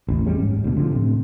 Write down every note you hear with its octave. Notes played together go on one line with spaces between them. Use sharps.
A1 D#2
E2 G3 G#3 C#4
G#2
D2 B2
D3 F3
A2 C3